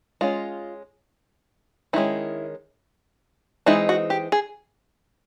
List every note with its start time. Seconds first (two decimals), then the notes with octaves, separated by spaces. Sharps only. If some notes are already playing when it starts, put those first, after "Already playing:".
0.21 G#3 C#4 F4
1.93 D#3 G#3 C#4 E4
3.66 E3 G#3 C4 D#4 E4
3.89 F#4
4.10 G4
4.32 G#4